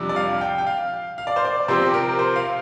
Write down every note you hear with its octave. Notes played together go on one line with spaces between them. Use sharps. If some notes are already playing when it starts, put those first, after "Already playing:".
Already playing: F2 C3 G3 D4
D5
F5
G5
G5
F5
F5
D5
C5
D5
C3 F3 C4 C5
G4
A#4
C5
F5